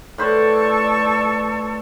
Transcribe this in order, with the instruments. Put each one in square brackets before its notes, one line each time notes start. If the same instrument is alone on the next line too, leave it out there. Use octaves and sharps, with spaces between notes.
[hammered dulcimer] A2 B4 C5 [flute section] A4 D5 C#6